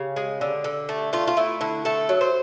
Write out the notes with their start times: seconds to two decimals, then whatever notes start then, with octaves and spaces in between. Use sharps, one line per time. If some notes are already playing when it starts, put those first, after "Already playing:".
Already playing: C#3 G4
0.16 G#3
0.41 D3
0.64 D3
0.89 A3
1.13 A3 F4
1.28 F4
1.37 A3 E4
1.61 D3 E4
1.85 A3 A4
2.09 F#3
2.21 C5